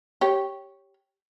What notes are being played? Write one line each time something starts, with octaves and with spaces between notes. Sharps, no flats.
G4 C#5